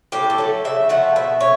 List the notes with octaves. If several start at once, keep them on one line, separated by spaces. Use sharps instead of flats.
A2 G4
A4
F#3 A3
C#3 E5
F3 A3 F#5
B2 E5
C#5